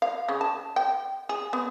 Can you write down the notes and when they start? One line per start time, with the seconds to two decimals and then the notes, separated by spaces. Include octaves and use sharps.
0.02 F5
0.29 C#3
0.41 A5
0.76 G5
1.29 G#4
1.53 B3